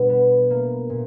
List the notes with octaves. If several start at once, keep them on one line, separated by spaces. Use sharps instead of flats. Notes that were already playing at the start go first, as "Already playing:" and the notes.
Already playing: B2 G3 D4
B3
A#3
A#2